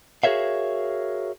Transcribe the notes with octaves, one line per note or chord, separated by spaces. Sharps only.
F#4 G#4 A#4 C#5 E5 F5